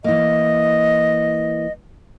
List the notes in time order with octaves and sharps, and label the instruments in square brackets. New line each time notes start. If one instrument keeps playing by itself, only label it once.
[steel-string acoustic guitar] E3 A#3 [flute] D#5